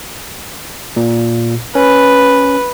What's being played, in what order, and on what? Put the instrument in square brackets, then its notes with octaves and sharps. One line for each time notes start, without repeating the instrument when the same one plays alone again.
[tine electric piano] A#2
[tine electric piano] C#4 [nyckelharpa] B4